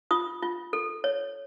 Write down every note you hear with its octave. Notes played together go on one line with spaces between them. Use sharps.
F4 D#6
F4
A4
C#5